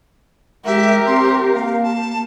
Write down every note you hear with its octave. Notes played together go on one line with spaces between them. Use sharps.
G#3 G4 A#4 E5
C4 C6
A#3 F5
A5